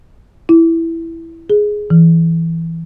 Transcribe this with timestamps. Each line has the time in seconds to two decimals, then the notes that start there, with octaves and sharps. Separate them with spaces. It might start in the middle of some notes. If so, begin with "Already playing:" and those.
0.49 E4
1.50 G#4
1.90 E3